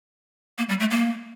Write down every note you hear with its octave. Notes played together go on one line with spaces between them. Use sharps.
A#3
G3
A3
A#3